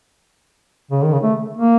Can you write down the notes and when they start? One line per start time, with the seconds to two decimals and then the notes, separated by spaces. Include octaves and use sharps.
0.91 C#3
1.03 D#3
1.13 C#3
1.24 A3
1.57 A#3